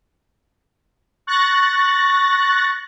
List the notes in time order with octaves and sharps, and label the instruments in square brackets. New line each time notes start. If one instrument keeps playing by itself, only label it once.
[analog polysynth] C#6 F#6 A6 A#6